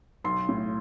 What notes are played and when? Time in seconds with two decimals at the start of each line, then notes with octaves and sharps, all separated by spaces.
0.24 B1 C6
0.49 A2